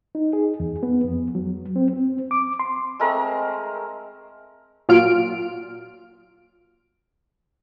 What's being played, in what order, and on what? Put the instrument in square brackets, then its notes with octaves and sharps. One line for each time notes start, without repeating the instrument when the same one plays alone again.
[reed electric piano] D#4
G#4
E2
B3
F2
F#3
C4
C4
D6
C6
[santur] G#3 A3 C4 A#4
[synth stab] A#2 F#3 F4 F6 D7